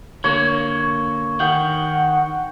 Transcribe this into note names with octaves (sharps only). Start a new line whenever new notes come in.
D3 A#3 C#5
D#3 F#5 G5